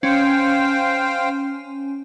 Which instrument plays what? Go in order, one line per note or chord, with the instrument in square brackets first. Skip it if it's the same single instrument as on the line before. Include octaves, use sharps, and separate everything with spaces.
[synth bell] C#4 [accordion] C5 F5 G5